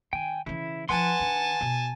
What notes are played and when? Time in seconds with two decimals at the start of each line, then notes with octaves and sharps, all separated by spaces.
0.13 D#3 G5 G#5
0.46 C#3 E3 E4
0.89 F3 E4 B4 F#5 G#5 A5 C6
1.20 D#3 D4
1.61 B2 B3